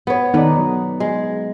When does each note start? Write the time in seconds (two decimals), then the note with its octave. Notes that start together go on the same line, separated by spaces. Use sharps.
0.07 B3 C#5
0.34 D#3 B3 D#4 A4 B4 D5
0.58 F#3
1.00 G#3